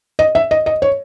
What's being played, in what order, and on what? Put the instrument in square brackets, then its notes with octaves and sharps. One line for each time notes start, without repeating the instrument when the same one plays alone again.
[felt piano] D#5
E5
D#5
D#5
C#5